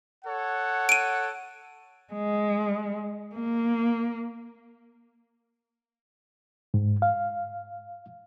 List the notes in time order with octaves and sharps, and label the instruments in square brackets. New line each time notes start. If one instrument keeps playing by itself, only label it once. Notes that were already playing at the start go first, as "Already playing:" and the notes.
[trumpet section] A4 C#5 F#5
[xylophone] D7 D#7
[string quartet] G#3
A#3
[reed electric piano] G#2
F5